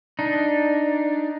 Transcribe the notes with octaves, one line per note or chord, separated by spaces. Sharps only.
D4 D#4